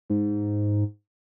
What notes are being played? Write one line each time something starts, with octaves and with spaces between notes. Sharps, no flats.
G#2